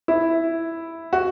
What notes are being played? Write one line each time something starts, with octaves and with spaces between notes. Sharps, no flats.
E4
F#4